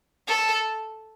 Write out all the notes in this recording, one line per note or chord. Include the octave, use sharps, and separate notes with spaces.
A4